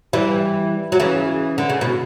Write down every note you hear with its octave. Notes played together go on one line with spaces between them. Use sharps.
E3 G3
F#3
C#3 E3
D3
C#3
B2